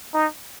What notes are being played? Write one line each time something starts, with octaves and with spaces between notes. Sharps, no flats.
D#4